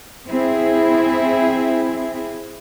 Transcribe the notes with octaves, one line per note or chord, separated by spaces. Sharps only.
C4 E4 G#4